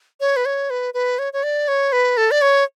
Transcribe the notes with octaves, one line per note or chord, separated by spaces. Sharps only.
C#5
B4
C#5
B4
B4
C#5
C#5
D5
C#5
B4
A4
D5
C#5